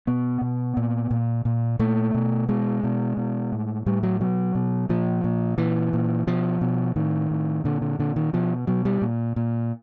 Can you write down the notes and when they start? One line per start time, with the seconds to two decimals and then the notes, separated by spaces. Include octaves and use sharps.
0.07 B2 B3
0.41 B2
0.77 A#2
1.11 A#2
1.45 A#2
1.79 A#2 A3
2.15 B2
2.49 B2 G#3
2.84 B2
3.17 B2
3.52 A2
3.86 A2 G3
4.03 F#3
4.20 B2 F#3
4.55 B2
4.89 A#2 F3
5.24 A#2
5.58 A#2 E3
5.93 A#2
6.27 B2 F3
6.61 B2
6.96 A2 D#3
7.31 A2
7.64 A#2 D3
7.82 D3
7.99 A#2 D3
8.16 D#3
8.33 B2 F3
8.67 B2 F#3
8.85 G3
9.02 A#2
9.36 A#2